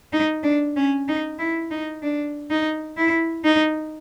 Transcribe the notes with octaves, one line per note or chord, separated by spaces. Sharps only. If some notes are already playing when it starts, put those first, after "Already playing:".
D#4
D4
C#4
D#4
E4
D#4
D4
D#4
E4
D#4